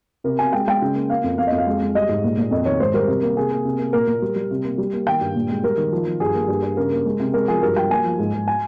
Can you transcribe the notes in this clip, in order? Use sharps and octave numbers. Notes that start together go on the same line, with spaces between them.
C3 A#4
C3 G#5
G#3 G5
G#3 G5
C#3
A#3
A#3 F5
F2
F2 F5
D#5
F2
F5
G#3
G#3
G3 D#5
G#2
A#2
A#2
F2 D#5
D#3 C#5
G#2 C5
G3 A#4
C3
A#3
C3 G#4
A#3
C3
A#3
A#2 A#4
A#2
G3
G3
C3
A#3
G3
A#3
D#3 G5
G2
A#2
G#3
G3 A#4
D#3
F3
F3
G2 G#4
A#3
G2
G2
C#3 A#4
A#3
G#3
C3
G#3 A#4
F3 G#4
G2 A#4
G3 G5
A#3 G#5
F3
G#2
G#2
G#5